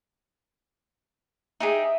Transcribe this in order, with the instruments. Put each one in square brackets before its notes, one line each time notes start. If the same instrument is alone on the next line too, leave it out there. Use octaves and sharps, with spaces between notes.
[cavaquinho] D#4 G4 G#4 [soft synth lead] E5